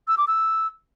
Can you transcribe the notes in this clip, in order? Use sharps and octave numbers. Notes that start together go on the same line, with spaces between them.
E6
D6
E6